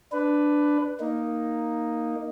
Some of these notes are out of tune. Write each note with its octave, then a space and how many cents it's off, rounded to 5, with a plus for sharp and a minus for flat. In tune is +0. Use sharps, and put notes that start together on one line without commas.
D4 +0 B4 +10
A#3 +0 D#4 +0